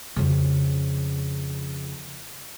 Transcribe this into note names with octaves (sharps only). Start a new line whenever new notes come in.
F2 C#3